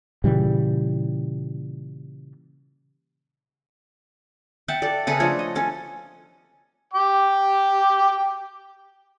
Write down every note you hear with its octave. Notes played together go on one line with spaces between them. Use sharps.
A#2 C#3 E3 G3
E5 F#5 G5 A5
A4 D5
C#3 A4 B4 E5
F3 A3 D4 C#5
D#5
C#4 A4
G5 D6